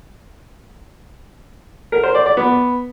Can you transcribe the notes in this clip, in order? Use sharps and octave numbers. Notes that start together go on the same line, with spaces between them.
A#4
C5
D5
D5
B3